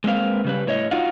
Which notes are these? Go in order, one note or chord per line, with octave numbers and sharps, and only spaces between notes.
G#3 A#3 C4 B4 F5
C#3 G3 B4
A2 C#5 D#5
D#4 F4 F#4 F5